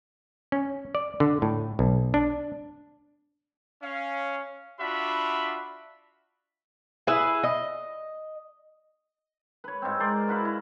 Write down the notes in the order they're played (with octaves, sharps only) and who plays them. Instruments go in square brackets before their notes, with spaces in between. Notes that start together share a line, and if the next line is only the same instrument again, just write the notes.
[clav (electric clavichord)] C#4
D5
D3
A2
B1
D4
[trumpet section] C#4 F5
D4 F4 F#4 E5 B5
[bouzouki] E4 G#4 B4 E5
D#5
[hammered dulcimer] B4 C#5
G#2 C4
A#4 C5 D5
E4 F#4 B4 F5
E4